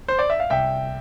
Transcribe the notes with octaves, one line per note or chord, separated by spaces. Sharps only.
C5
D5
E5
F5
C2 E5 G5